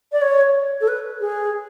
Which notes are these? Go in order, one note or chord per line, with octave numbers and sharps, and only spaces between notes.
D5
C#5
A4
B4
G#4